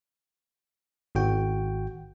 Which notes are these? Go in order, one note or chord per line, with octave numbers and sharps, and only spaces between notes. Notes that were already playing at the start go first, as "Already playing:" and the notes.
G#1 F#4 G5